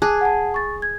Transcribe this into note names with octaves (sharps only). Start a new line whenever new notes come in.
G#4 A5 D6 F#6
F#5 G#5 A5
C#6 A6
G#6